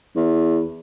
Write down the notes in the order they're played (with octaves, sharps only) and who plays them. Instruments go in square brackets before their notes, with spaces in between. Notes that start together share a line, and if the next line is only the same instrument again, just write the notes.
[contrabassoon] E2